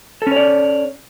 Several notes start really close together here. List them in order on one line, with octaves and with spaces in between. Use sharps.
A4 C#4 C#5 D5